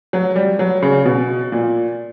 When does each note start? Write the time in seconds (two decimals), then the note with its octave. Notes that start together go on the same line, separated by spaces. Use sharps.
0.13 F#3
0.36 G3
0.59 F#3
0.82 C#3
1.05 B2
1.52 A#2